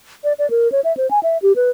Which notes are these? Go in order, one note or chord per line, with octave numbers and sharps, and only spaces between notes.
D5
D5
A#4
C#5
E5
C5
G#5
E5
G4
B4